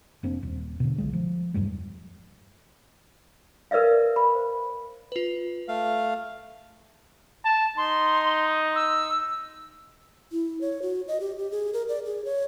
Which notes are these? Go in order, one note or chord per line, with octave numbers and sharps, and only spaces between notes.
F1 A#3 C4 D4
D#1
B2 D3
B1 G#3
F3
E1 G2 F#3 G#3
A#4 B4 D5 E5 F5
B5
C5
F4 B4
A3 F5
A5
D#4 C6
E6
E4
C#5
F#4
D#5
G4
G4
G#4
A#4
D5
G#4
C#5